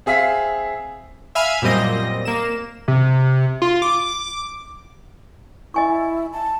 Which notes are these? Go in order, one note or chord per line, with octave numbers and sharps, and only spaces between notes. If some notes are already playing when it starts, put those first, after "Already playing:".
C4 G#4 E5 F5 B6
E5 F5 G#5 B5 F6
F#2 A#2 G3 C4 D#5 A#6
A#3 E7
C3
F4
D6
E4 D#5 G#5 C#6
A5